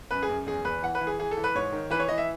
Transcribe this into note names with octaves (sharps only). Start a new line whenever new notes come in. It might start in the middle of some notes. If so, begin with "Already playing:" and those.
F#2 B4
G#4
F#2
E2 G#4
E2 B4
E3 F#5
B4
E3
G#4
E3 G#4
A4
E3
B4
G#2 C#5
D#3
E3 B4
C#5
E3 D#5
E5